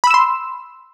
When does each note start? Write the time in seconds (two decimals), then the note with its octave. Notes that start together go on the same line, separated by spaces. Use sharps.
0.04 B5
0.07 E6
0.11 E7
0.14 C6